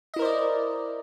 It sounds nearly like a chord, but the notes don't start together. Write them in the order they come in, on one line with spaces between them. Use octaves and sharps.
D#5 E4 A#4 C5 D5